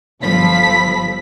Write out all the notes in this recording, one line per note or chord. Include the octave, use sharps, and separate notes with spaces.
G1 F3 A4 B5 B6